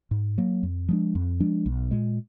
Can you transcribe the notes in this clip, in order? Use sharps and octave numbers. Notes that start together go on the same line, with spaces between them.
G#2
F#3 A#3
F2
F3 G#3 D4
F2
F3 G#3 D4
B1
A#2 G#3